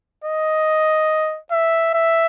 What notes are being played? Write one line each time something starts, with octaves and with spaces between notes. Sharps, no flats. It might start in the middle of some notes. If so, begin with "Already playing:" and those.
D#5
E5
E5